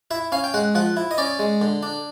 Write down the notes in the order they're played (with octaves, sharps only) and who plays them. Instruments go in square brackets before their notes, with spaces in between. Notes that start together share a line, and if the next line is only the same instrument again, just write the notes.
[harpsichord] E4 E5
C#4 F5
G5
G#3 F#5
F3 F#5
E4
D#5
C#4 D5
G#3
D3
D4